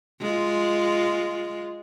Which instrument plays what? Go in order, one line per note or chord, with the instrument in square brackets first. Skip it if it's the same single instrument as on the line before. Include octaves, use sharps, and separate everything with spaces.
[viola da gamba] G#3 F4